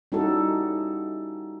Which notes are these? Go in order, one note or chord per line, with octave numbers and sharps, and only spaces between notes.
G3 C#4 D#4 E4 F#4 A4